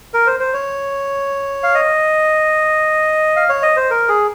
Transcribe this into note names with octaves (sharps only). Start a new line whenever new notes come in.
A#4
C5
C5
C#5
F5
D#5
F5
C#5
D#5
C5
A#4
G#4